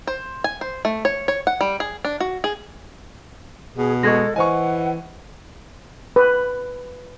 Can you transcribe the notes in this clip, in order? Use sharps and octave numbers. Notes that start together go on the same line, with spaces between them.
C5
G#5
C5
A3
C#5
C#5
F#5
G3
G#4
D4
F#4
G#4
B2 G#4
G#3 A4 D#5 C#6 G#6 A#6
E3 C5 D#5 F#5 G#5 C#6
B4